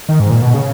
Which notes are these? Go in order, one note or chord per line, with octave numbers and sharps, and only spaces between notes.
D#3
G#2
A#2
B2
C#3